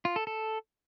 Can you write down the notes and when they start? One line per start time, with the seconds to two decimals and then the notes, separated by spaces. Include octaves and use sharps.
0.05 F4
0.16 A4
0.27 A4